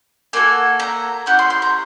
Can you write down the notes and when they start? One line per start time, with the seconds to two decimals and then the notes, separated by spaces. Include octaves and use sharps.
0.33 A#3 D4 F#4 A4 G#5
0.80 A#5
1.26 C#4 E4 G4 F#5
1.39 C6
1.50 C6
1.62 A#5